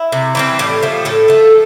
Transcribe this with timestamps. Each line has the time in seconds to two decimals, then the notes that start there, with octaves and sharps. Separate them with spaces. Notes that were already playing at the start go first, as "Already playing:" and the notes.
Already playing: E4
0.12 C3
0.35 E3 G3 C4
0.59 A2 G4
0.83 F3 A3
1.05 A2 A4
1.28 F3 A3